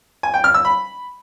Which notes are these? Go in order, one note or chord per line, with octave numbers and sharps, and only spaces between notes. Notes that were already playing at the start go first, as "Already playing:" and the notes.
G#5
G5
F6
E6
B5